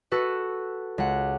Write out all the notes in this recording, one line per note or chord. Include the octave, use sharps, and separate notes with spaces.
F#4 A4 B4
C#2 F#5